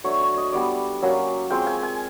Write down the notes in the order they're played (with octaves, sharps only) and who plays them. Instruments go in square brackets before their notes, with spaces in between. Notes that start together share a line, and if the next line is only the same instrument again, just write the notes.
[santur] F#3 A3 D4 C#5
C#5
D#5
G3 B3 D4 D5
F#3 A#3 C#4
G#3 C4 F4 G5
G#5
G#5